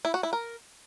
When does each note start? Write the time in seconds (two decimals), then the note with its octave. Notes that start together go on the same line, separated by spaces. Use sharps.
0.05 E4
0.14 F#4
0.23 E4
0.33 A#4